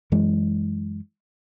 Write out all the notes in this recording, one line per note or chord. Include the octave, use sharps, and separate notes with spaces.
F#2 E3 G#3